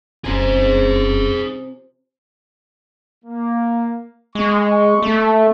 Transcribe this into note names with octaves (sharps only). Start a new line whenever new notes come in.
F1 F#2 C3 F3 C#4 G#4 C5
A#3
G#3 C#6
A3